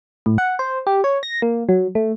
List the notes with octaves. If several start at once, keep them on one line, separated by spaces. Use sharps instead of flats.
A2
F#5
C5
G4
C#5
A#6
A#3
F#3
A3